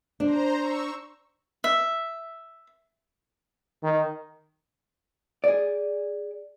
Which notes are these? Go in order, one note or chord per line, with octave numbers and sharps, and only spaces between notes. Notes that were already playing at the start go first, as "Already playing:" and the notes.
D4 C5 A#5
C#6 E6
E5
D#3
G#4 D5